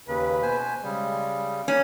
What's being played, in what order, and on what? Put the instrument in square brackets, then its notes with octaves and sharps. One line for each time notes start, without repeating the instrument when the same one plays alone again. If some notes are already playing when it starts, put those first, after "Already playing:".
[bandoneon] D#2 C#3 [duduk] B4
[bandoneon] B2 C5 G#5
[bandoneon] C#3 G3 [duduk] G#3
[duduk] A#3 [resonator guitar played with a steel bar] C#4